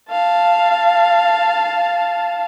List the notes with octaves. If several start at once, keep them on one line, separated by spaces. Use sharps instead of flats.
F5 A5